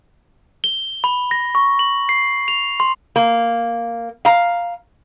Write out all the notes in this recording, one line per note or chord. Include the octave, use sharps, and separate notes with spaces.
G7
B5
A#6
C#6
F#7
C7
F7
C6
A#3
F5 A#5